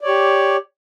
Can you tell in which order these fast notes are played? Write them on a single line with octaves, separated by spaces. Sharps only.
D5 C#5 G4